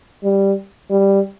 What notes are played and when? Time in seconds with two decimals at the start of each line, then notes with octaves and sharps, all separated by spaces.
0.23 G3
0.90 G3